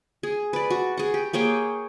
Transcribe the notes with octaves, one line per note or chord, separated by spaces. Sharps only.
G#4
B4 D5
F#4
G#4 F#5
G4
A#3 G#4 C#5 G5